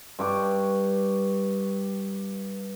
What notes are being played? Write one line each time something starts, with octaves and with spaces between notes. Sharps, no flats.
G2 C#6 D6